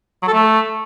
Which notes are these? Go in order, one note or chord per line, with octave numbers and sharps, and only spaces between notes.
F#3
A4
A3